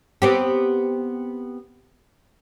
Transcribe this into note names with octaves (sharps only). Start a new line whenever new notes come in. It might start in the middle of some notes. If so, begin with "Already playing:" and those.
B3 C4 G4